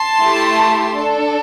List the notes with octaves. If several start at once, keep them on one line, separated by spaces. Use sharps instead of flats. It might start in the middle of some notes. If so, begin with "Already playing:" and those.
Already playing: A5 C6
A3 E4 G4
D4
A4